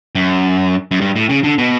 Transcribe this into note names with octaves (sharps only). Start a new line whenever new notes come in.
F#2
F#2
G2
A2
C#3
D3
B2